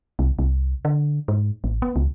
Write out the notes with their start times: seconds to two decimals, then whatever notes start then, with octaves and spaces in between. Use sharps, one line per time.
0.19 C2
0.39 C2
0.85 D3
1.28 G#2
1.64 A1
1.82 B3
1.96 C#2